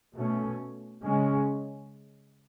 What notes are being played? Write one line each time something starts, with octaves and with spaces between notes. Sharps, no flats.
B2 A3 C#4
C#3 G#3 C#4